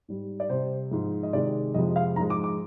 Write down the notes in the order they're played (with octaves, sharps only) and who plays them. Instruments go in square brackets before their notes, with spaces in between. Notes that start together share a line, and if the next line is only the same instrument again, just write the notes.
[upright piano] G#2 G3
D5
C3 G3 C5
G#2 F3 G#3
D#5
C3 D#3 G#3 D5
F2 C3 F3 G#3 D#5
F5
G#2 F3 G#3 A#5
D6
D6